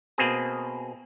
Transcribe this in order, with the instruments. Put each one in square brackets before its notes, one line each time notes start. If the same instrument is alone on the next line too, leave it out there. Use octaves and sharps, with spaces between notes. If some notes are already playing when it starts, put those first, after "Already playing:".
[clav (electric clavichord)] B2 A#3 C4 G#4